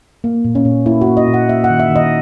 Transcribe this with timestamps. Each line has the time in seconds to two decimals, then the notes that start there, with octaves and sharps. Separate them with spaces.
0.24 A#3
0.44 A#2
0.55 C#4
0.65 A#2
0.86 A#3 E4
1.01 F#4
1.07 A#3
1.17 D#5
1.28 A#2
1.34 F#5
1.49 A#3 E5
1.64 F#5
1.70 D#3
1.80 E5
1.90 D#3
1.96 D#5